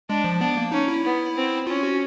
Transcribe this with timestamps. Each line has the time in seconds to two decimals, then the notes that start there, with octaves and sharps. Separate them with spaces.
0.09 G#3 D4
0.24 F3
0.40 B3 D4
0.57 A#3
0.72 C#4 D#4
0.88 E4
1.05 B3
1.36 C4
1.67 C#4 F4
1.83 F#4